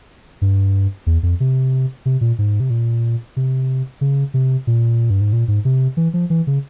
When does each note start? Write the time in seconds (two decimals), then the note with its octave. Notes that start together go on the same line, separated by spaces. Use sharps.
0.42 G2
1.07 E2
1.23 F2
1.40 C3
2.06 C3
2.21 A#2
2.38 G#2
2.60 C3
2.70 A#2
3.37 C3
4.01 C#3
4.34 C3
4.67 A#2
5.10 G2
5.21 G#2
5.33 A#2
5.48 G#2
5.65 C3
5.97 E3
6.14 F3
6.30 E3
6.47 C#3